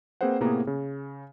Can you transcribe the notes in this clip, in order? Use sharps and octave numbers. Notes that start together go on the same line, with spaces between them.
A#3 C4 G#4 B4 C5 F#5
A2 C3 A#3 B3 G#4 A#5
C#3